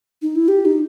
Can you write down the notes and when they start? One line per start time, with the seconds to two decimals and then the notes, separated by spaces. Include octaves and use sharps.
0.22 D#4
0.35 E4
0.48 G4
0.65 D#4